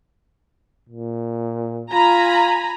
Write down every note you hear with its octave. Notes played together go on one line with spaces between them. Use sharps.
A#2
F4 G#5 A#5 B5